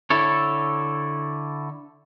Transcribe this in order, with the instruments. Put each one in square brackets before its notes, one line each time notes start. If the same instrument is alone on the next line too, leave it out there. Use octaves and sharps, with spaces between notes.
[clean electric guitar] D3 E4 A4 C#5